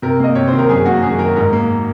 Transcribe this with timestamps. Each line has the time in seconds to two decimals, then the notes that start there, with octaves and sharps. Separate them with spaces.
0.02 C3 A#4
0.20 A#3 D#5
0.35 C3 C#5
0.48 D#3 C5
0.59 A#4
0.69 F#2 G#4
0.86 A#3 F#4
1.02 F#2 G#4
1.19 D#3 A#4
1.36 G#2 A#4
1.53 A#3